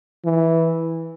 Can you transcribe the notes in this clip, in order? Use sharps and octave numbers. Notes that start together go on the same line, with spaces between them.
E3